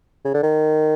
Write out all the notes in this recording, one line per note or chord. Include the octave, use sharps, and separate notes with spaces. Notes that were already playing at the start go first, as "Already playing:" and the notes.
C#3
D3
D#3